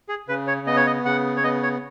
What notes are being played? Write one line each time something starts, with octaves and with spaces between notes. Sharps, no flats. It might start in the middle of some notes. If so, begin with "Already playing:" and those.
G#4
C#3 B4
C#5
B3 D#5
C#5
D#5
C#3 F#5
C#5
B3 D#5
C#5